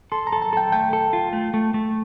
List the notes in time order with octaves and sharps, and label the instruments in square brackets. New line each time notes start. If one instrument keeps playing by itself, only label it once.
[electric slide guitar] A4 [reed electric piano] C6
[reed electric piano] A#5
[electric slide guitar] A4
[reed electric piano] A5
[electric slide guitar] A4 [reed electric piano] G5
[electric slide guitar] A3 [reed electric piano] G5
[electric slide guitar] A4
F4
A3
A3
A3